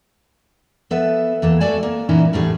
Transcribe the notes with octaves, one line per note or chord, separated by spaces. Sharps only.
F3 B3 A4 B4 E5
E2 A#3 A4
A3 F#4 A4 D5 G#5 A5
A#3
A#2 E3 B3 C#4 D#4 E4
E2 A2 G3 A3 G#4